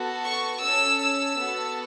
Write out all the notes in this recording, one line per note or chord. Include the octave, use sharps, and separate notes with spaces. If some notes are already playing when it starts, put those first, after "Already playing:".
Already playing: B3 F#4 A4
C#6
C#4 A4 E6
E6
B3 F#4 A4